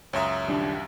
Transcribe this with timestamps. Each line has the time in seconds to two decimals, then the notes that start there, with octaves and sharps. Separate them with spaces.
0.13 C#2 F#2 C#5 E5 A#5 D#6
0.48 D#1 D4